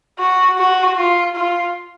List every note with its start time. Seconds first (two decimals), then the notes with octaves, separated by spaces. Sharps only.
0.19 F#4
0.58 F#4
0.97 F4
1.35 F4